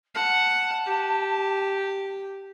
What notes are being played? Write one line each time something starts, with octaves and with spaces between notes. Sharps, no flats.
F#5 A5
G4